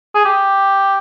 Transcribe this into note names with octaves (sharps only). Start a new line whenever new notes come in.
G#4
G4